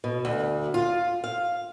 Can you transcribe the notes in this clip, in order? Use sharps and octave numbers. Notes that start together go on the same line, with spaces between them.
B2
D2
F4
F5